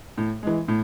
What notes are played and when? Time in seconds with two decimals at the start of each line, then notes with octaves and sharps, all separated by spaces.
0.18 A2
0.43 E3 G#3
0.68 A2